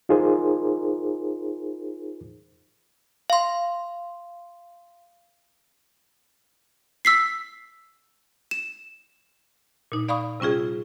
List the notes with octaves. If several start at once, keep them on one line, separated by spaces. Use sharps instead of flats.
D#4 F4 G#4 A#4 C5
F5 C6
E6 B6 C7
E7
A#2 D#4
D5 F5 B5 C#6 D#6
C3 G3 C#4 F4 G#4